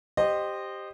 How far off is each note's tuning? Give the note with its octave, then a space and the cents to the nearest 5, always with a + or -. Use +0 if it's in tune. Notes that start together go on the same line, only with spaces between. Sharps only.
G4 +0 C5 +0 D#5 -20